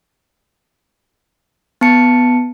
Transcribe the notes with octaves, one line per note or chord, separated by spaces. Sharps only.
B3 A5 C#7